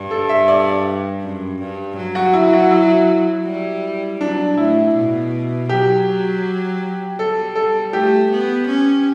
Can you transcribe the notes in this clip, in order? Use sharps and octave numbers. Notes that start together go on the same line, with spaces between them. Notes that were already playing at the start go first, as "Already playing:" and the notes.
Already playing: G2
A4
E5
D5
F#2
G2
F#3
F#4
E4
F#4
E4
G3
F#3 D4
A2 E4
B2
F#3 G4
G3 A4
A4
A3 G4
B3
C#4